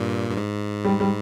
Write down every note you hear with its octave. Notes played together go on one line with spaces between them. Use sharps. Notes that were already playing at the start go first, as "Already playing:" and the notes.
Already playing: G2 A#2
G2
G#2
G3
G3